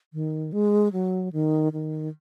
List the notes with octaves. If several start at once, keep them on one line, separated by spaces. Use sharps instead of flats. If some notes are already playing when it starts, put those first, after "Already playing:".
D#3
G#3
F#3
D#3
D#3